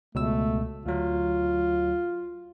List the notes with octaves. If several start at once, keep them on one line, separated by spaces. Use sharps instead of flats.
C#2 B2 A3 E6
D2 F#3 F4